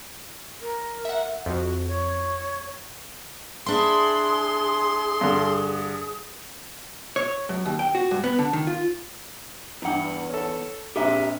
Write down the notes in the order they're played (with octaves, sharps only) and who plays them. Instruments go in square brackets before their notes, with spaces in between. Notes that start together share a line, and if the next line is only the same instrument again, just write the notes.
[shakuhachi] A#4
[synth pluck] E5 F#5
[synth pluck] F2 [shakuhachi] F#4
[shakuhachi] C#5
[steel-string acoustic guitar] D4 E4 [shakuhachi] G#4 [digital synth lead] C6
[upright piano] G2 D3
[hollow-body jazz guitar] C#5
F#2
D#2
G5
F#4
G2
B3
D3
D#3
F4
[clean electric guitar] E2 F#5 [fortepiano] G2 E3
[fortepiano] C#4 A4
[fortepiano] A#1 C4 [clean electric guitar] G4 G#4 E5